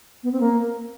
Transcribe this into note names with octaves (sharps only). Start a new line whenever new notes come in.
B3
C4
A#3